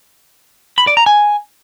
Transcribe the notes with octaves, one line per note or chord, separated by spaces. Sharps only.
B5
D5
A#5
G#5